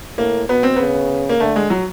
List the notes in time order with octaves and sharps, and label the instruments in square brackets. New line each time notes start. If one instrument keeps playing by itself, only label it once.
[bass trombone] A2 [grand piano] A#3
[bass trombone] B2 [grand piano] B3
[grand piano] C4
[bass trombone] C#3 [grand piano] B3
[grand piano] A#3
[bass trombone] D3 [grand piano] A3
[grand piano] G#3
F#3